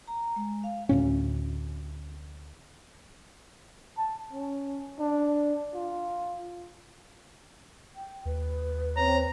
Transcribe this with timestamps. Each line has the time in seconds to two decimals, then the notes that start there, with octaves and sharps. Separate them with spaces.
0.08 A#5
0.36 G#3
0.64 F5
0.89 D2 A2 C#4
3.98 A5
4.33 C#4
4.99 D4
5.74 F4
7.95 G5
8.25 D#2 B4
8.97 C4 C#5 A#5